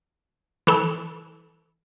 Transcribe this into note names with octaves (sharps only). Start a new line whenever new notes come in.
E3 A4